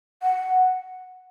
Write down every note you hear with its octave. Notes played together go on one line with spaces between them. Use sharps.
F#5